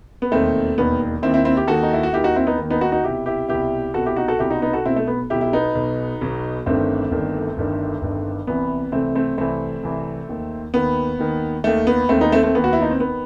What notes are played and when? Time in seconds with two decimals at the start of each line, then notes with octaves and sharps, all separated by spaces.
0.22 B3
0.32 E1 D#2 D#3 A3 C4
0.78 E1 D#2 D#3 B3
1.22 D#3 C4 E4
1.26 D#2
1.34 C4 E4
1.45 C4 E4
1.57 E4 G4
1.68 D#2 D#3 F#4 A4
1.83 D#4
1.93 E4
2.03 F#4
2.13 D#2 D#3 E4 G4
2.24 D#4 F#4
2.36 C4 E4
2.47 B3 D#4
2.58 D#2 D#3
2.70 B3 D#4
2.81 D#4 F#4
2.92 D#4 F#4
3.03 C2 B2 E4 G4
3.26 E4 G4
3.48 C2 B2 E4 G4
3.94 C2 B2 F#4 A4
4.06 E4 G4
4.16 D#4 F#4
4.28 F#4 A4
4.39 C2 B2 E4 G4
4.50 D#4 F#4
4.62 B3 D#4
4.73 F#4 A4
4.85 B1 B2 C4 E4
4.96 A3
5.07 B3
5.30 B1 B2 E4 G4
5.41 E4
5.53 B3 D#4
5.75 B1 B2
6.21 B1 B2
6.66 G1 G2 D#3 A3 C4
7.11 G1 G2 D#3
7.57 G1 G2 D#3
8.02 G1 G2 D#3
8.47 C2 C3 E3 B3
8.92 C2 C3 E3 A3 C4
9.15 A3 C4
9.38 C2 C3 E3 A3 C4
9.83 C2 C3 E3
10.29 D#2 D#3
10.74 D#2 D#3 B3
11.19 D#2 D#3
11.64 D#2 D#3 A3
11.87 B3
12.09 D#2 D#3 A3 C4
12.21 B3 D#4
12.32 A3 C4
12.43 A3 C4
12.55 D#2 D#3 B3
12.64 F#4
12.73 E4
12.82 D#4
12.91 C4
13.00 D#3 B3